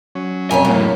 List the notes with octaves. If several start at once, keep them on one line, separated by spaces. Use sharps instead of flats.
F#3 C#4
F2 C3 C#5 G#5
F#2 A2 A#3
B5